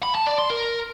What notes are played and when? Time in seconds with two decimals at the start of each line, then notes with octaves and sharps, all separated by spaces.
0.03 B5
0.15 A5
0.27 D5
0.38 C6
0.50 A#4